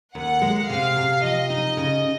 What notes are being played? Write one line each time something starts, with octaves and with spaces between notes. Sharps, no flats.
D#2 F#5
G#3
C3 F5
C3
F3 D#5
D#4
C#3